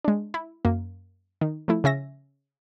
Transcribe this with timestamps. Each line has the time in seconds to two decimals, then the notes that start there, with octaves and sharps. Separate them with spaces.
0.04 G#3 D4
0.34 E4
0.65 F#2 A#3
1.41 D#3
1.68 F3 A3 E4
1.84 C#3 C#4 E5 A#6